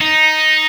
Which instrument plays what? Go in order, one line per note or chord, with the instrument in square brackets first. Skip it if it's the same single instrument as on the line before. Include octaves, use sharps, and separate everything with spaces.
[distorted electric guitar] D#4